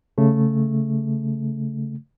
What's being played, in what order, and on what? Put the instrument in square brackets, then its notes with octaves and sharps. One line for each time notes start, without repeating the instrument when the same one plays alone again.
[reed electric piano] C#3 A3